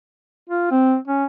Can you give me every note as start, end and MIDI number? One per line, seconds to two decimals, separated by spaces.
0.50 0.67 65
0.71 0.96 60
1.08 1.25 61